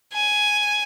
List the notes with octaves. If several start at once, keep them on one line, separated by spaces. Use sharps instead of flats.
G#5